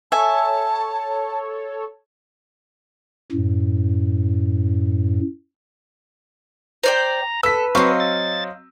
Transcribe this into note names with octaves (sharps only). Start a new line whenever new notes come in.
A4 C#5 E5 G#5 A5
F#2 A2
C5 D5 G5 A#5
A4 B4 E6 B6
F#3 C4 D#5 F5 C#6
A6